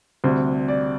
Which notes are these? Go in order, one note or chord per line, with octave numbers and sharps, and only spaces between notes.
D2 C3 G3 C5
D5